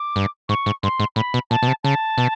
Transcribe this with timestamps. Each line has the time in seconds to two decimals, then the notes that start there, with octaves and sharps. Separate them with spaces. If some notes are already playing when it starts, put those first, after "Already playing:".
Already playing: D6
0.16 G2
0.49 G#2 C#6
0.66 G#2
0.83 G2 C6
1.00 G#2
1.16 A2 B5
1.34 B2
1.51 A#2 A5
1.63 B2
1.67 C3
1.84 C#3 A5
2.18 B2